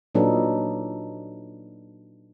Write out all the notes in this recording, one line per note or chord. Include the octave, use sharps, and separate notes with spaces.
A#2 F#3 D4 D#4 A4 B4